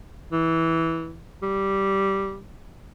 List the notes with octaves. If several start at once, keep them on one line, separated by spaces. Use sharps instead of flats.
E3
G3